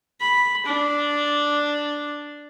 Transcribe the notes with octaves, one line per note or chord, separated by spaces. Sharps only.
B5
D4